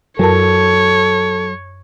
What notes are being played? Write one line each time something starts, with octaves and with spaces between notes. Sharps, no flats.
F#2 F#3 A4 A#4 C#5 A5